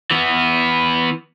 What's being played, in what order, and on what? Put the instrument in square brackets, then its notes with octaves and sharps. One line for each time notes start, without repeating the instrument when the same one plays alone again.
[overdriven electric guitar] E3 B3